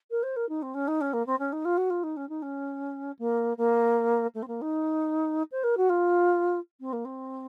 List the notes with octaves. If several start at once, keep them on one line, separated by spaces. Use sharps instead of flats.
A#4
C5
A#4
D#4
C4
C#4
D#4
C#4
A#3
C4
C#4
D#4
F4
F#4
F4
D#4
C#4
D#4
C#4
A#3
A#3
A3
C4
A#3
D#4
C5
A#4
F#4
F4
C4
A#3
C4